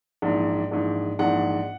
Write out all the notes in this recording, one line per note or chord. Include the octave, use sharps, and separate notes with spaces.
A#1 G#2 E3
A#1 G#2 E3
A#1 G#2 E3 F#5